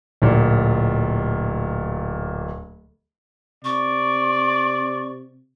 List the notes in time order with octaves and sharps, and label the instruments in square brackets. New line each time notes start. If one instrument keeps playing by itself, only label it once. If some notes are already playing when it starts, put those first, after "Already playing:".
[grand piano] D1 A#2
[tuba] C3 [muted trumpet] D5 [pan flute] C#6